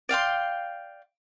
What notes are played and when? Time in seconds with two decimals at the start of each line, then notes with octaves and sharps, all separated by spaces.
0.09 D5 F5 G5 C6